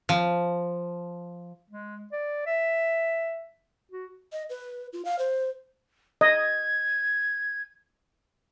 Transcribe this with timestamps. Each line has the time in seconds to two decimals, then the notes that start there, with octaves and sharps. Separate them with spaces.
0.09 F3
1.70 G#3
2.12 D5
2.47 E5
3.92 F#4
4.32 D#5
4.50 B4
4.93 F4
5.05 F5
5.19 C5
6.21 D#5 G#6